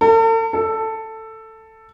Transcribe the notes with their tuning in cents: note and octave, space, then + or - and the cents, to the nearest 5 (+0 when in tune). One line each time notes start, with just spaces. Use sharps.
A4 +45
A4 +10